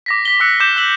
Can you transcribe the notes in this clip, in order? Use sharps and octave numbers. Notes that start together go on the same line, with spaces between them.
D6 A#6 B6
B6 G7
D6 E6 F#6 C#7
D6 G6 E7
E6 F#6 B6 F#7 G7